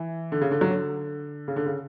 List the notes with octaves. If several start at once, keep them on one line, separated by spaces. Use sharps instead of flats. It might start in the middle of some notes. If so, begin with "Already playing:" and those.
Already playing: E3
D3
C#3
D3
F#3
D3
C#3
D3
C#3